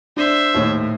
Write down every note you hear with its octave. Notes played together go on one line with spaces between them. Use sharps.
D4 C5 E5
D#2 A2 C#5